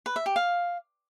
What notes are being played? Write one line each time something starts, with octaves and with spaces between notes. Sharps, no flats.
B4
E5
G4
F5